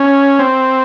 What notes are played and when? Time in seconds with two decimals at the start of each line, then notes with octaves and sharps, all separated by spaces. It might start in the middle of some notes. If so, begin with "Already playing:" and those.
Already playing: C#4
0.39 C4